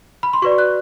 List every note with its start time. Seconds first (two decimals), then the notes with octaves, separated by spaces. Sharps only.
0.23 B5
0.33 C6
0.42 F#4 B4 D5 C#6
0.58 F#6